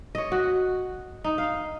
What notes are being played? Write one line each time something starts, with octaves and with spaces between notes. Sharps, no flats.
C#5 D#5
F#4
D#4
F5